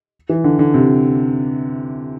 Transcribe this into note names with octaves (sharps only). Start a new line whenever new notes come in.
E3
D3
D3
C3